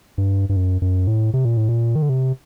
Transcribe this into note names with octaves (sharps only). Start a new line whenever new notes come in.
G2
G2
F#2
F#2
A2
C3
A#2
A2
A#2
D#3
D3
C3